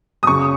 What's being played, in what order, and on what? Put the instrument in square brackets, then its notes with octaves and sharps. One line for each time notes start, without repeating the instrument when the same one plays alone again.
[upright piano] D#6
F#2 C#3 C#6